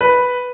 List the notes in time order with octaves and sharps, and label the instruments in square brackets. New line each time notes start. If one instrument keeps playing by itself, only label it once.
[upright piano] B4